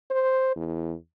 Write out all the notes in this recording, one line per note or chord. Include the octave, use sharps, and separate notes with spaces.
C5
E2